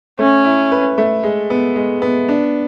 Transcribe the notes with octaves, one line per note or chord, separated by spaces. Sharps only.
A3 C#4
E4
B4
A3
G#3
B3
G#3
B3
D4